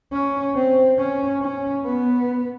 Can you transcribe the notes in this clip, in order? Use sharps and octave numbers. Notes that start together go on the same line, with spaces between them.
C#4
C4
C#4
C#4
B3